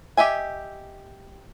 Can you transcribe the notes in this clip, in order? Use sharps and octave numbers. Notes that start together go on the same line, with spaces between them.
G4 D#5 E5 G#5